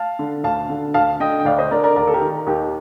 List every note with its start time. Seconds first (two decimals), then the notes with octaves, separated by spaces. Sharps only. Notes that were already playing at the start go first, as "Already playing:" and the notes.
Already playing: F5 A5
0.19 D3
0.44 D2 F5 A5
0.69 D3
0.94 D2 F5 A5
1.20 D3 D#5 G5
1.40 G5
1.45 D2 D5 F5
1.58 C5 D#5
1.71 D3 A#4 D5
1.83 A#4 D5
1.96 D#2 A#4 D5
2.07 A4
2.14 G4 A#4
2.22 D#3
2.47 D#2 D#4 G4